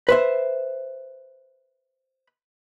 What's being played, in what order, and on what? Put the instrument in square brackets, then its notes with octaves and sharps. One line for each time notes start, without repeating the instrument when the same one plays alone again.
[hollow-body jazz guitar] B4 C5 E5